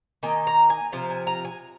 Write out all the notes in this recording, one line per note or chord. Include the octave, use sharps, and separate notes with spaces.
D#3 A#3 D#4 G#5
A#5
G#5
C3 F3
G#5
A#5
G#5